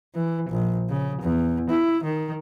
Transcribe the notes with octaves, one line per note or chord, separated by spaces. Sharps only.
E3
A#1
C#3
E2
E4
D#3